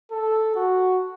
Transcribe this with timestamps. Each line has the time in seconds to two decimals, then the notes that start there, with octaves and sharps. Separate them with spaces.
0.11 A4
0.56 F#4